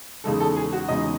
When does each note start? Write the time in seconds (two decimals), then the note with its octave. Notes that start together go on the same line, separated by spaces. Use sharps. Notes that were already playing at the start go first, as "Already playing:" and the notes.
0.24 E2 C#3 G#3 D#4 A4
0.40 A4
0.56 G#4
0.73 F#4
0.89 E2 C#3 G#3 D#4 D#5